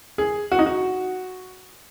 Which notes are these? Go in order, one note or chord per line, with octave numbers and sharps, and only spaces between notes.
G#4
F#4
D#4
F#4